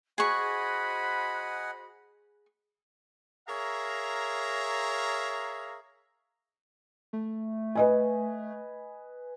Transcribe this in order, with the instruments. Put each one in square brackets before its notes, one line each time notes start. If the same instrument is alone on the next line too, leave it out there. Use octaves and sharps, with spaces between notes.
[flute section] F#4 C5 B5 [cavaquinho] G#4 C#6 [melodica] D#5 F#5 G#5
[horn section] G#4 A#4 C#5 E5 F5 A#5
[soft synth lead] A3
[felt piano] B4 D#5 G#5